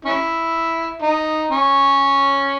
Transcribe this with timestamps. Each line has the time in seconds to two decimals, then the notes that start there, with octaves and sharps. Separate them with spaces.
0.05 C#4 E4
1.02 D#4
1.51 C#4